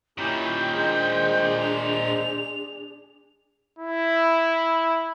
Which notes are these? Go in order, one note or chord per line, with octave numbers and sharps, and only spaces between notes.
A#2 D#3 C#4 E4 G4 G5
G#3 D4 G#4 C5
F7
E4